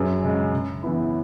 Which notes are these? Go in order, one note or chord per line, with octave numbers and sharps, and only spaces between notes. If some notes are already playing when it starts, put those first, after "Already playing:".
Already playing: F#2 G#4 B4
C#3 G#3
C#3
E3 B3 E4